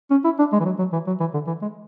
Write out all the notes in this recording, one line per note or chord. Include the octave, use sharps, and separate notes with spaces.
C#4
E4
D4
G#3
E3
F#3
F#3
E3
F#3
E3
D3
E3
G#3